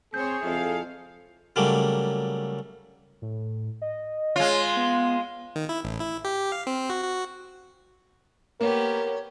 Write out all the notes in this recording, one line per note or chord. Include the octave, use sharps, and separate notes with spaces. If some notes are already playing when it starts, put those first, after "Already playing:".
C4 G#4 C5 C#5 G6
F2 E4 A4 F5
C#3 F#3 G3 A3 A#3
A2
D#5
G#3 F4 C#5
B3
D#3
E4
A1
E4
G4
F5
C4
F#4
F#4
A#3 B3 G4 A#4 C#5